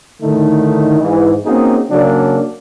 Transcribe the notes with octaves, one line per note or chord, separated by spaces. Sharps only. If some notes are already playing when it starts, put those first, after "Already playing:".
A2 D3 D#3 A3 D#4
G#2 E3
A#3 C4 C#4 D#4 F#4 G#4
C#3 F#3 A#3 C#4 D4